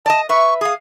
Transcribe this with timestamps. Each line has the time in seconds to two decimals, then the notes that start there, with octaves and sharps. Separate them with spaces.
0.06 D5 D#5 A5
0.29 B4 E5 C#6
0.61 G#4 F5 D#6